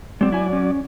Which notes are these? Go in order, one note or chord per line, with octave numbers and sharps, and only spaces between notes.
F#3 G#3 C4 D5
E4 G#5
C#4